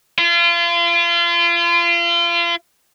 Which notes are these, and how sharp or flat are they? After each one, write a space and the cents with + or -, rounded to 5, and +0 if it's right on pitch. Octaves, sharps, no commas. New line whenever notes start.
F4 -35